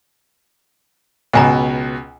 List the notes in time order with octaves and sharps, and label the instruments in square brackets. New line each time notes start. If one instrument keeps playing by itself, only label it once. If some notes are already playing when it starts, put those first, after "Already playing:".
[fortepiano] C#2 B2 [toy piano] F#5 G#5 A#5